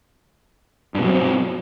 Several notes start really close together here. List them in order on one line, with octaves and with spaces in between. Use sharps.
G2 B2 F#3 C4